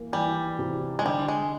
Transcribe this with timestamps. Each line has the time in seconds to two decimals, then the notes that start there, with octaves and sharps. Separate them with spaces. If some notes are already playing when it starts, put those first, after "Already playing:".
Already playing: E3 A#3
0.12 E3 G3
0.59 C3
0.99 G#3
1.05 D3 G3
1.28 G#3